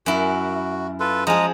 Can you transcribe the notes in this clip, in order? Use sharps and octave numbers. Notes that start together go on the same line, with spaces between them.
F#2 E4 F#4
F4 A4 B4
F3 G#3 G#4 A#5 D#6